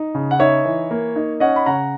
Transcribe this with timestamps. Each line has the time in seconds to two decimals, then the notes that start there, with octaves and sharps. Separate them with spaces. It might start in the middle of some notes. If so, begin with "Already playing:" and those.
Already playing: D#4
0.15 C#3
0.31 F#5
0.39 D#4 C#5 E5
0.65 E3
0.91 A#3
1.16 D#4
1.40 C#4 D#5 F#5
1.56 B5
1.66 C#3 F#5 A#5